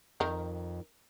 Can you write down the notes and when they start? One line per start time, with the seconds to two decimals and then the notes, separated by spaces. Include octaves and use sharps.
0.20 F2 D#3 A#4